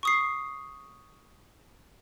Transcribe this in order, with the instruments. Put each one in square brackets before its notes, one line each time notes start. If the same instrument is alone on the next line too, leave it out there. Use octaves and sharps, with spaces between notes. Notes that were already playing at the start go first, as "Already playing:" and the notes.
[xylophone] C#6 D#6 C7